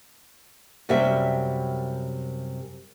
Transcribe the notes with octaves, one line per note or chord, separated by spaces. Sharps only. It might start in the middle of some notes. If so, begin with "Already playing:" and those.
F#2 C3 G3 G4 E5